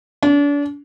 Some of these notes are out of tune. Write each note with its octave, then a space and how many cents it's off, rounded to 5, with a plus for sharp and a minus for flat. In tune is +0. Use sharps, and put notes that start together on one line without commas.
D4 -35